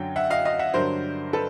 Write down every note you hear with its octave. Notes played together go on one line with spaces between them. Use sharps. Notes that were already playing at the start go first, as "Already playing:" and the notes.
Already playing: F#2 D3 F#3 G5
E5 F#5
D#5 F5
D#5 F5
E5 F#5
G2 D3 F#3 A#4 C5
A4 B4